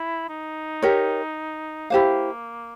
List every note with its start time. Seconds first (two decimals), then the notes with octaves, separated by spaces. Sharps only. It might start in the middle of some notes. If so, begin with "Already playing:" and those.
Already playing: E4
0.29 D#4
0.82 G4 A#4 C#5
1.90 A#3 E4 G4 C5 F5